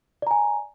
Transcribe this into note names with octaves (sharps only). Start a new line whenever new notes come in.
D5 G#5 A#5